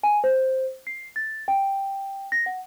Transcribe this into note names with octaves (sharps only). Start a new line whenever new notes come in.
G#5
C5
C7
A6
G5
A#6
F#5